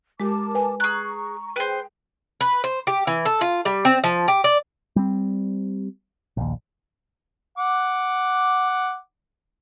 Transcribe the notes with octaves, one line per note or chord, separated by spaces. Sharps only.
G#3 G4 A#4 A5 D6
B4 G#5
G#4 A#5 C#6 F#6
G#4 B4 C5 G5
B4
C5
G4
E3
A4
F4
G3
C4
F3
G4
D5
G3 C4
A#1 D#2
F#5 D6